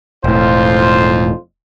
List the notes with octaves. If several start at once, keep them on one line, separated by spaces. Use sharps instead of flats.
E1 F2 A2 F4 C5